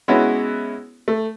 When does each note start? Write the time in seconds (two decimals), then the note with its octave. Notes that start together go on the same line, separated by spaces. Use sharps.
0.08 G#3 B3 C#4 E4 F#4
1.08 A3